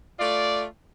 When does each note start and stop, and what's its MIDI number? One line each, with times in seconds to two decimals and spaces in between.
0.19 0.65 57
0.19 0.65 65
0.19 0.65 74